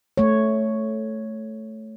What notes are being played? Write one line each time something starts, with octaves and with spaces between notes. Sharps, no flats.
A3 C#5